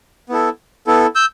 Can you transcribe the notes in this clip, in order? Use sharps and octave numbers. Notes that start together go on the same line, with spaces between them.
B3 E4 A4
B3 E4 A4
E6 G6